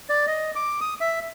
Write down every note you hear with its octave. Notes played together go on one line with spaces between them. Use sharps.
D5
D#5
D6
D#6
E5